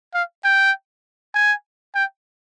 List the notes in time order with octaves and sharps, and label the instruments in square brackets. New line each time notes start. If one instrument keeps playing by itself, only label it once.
[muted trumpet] F5
G5
G#5
G5